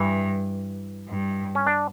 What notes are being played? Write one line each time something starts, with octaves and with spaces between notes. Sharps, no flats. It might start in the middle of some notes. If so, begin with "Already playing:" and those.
Already playing: G2 E3
G2
C#4
D4